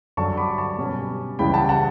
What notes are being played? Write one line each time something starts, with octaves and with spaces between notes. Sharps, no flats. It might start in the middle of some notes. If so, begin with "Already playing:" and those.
G2 D3 F#3 A5 C#6
B5 D6
A5 C#6
B2 G3 C#4
C#2 C#3 E3 G3 G5 B5
F#5 A5
F#5 A5